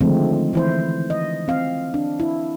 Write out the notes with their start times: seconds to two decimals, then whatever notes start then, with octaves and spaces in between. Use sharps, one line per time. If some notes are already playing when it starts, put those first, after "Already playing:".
0.01 D3 D#3 F3 G#3 A3 C4
0.53 E3 E4 C5
1.10 D#5
1.48 C4 F5
1.94 D4
2.20 E4